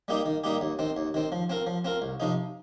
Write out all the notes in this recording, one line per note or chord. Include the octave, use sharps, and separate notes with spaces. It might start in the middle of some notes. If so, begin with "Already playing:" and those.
G3 A#3 D#4 G4
D#3
G3 A#3 D#4 G4
D#2
D#3 C4
D#2
D#3 C4
F3
C4 F4 A#4
F3
C4 F4 A#4
C2
C3 F3 D#4